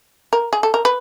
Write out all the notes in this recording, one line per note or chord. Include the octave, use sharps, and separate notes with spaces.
A#4
G#4
A4
A#4
B4